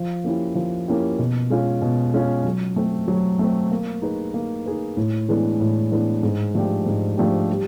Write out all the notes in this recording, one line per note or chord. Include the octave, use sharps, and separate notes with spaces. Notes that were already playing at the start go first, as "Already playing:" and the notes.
Already playing: F3
A#3 C#4 E4 G4
F3
A#3 C#4 E4 G4
B2
G#3 C#4 F4
B2
G#3 C#4 F4
F#3
A3 C4
F#3
A3 C4
A#3
D#4 G#4 B4
A#3
D#4 G#4 B4
A2
E3 G#3 B3 D4
A2
E3 G#3 B3 D4
G#2
F3 A3 D4 G4
G#2
F3 A3 D4 G4
G3